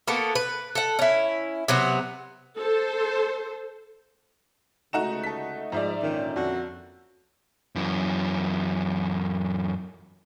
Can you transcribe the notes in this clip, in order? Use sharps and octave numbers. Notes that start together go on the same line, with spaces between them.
A#3 B3 F#4 A4
B4
A4 F#5
C#4 E4
C3 F#3 B3 F#4
A4 C5
C#2 D3 A3 D#4 F#4 F#5 A#5 E7
A4 B6
G#2 F3 G#3 D5 E5 A#5
A#2 D3 D#3 C#4
F2 F#4
F#2 E3